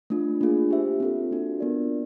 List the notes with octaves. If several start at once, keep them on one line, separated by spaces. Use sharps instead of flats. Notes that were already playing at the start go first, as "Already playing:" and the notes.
A3 D4 F4
A#3 D4 F4 G#4
G4 C5 E5
C4 F4 A4
A#3 D4 F#4 A4
B3 D4 F4 A#4 D5